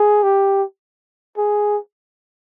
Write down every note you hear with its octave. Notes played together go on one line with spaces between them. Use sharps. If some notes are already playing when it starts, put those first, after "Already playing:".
Already playing: G#4
G4
G#4